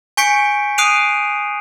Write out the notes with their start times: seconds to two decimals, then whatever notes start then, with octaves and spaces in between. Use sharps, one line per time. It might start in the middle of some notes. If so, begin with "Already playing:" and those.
0.17 G#5 C#6 G6 B6 C#7 D7
0.78 D#6 F#6 C7 D7 D#7 F7